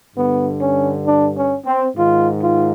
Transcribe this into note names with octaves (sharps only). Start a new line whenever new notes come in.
G2 D3 B3
C#4
D4
C#4
C4
G#2 D#3 F4
F4